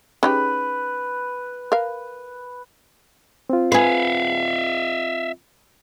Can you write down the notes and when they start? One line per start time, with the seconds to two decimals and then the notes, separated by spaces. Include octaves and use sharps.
0.23 C#4 D#4 G4 B4
1.72 A#4 F5
3.50 C4 F4
3.72 G#4 B4 E5 F5